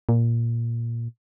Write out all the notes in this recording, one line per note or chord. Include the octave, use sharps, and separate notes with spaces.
A#2